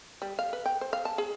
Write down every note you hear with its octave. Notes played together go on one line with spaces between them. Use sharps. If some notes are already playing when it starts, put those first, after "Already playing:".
G3
F5
B4
G5
C5
F5
A5
G#4